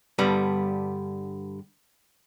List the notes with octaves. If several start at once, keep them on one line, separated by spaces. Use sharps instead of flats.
G2 D3 G3 B3